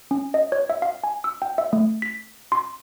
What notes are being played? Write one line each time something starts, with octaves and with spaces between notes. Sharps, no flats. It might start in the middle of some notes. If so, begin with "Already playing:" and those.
C#4
D#5
C#5
E5
F5
G#5
E6
G5
E5
A3
B6
C6